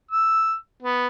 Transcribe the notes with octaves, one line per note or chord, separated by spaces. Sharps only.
E6
B3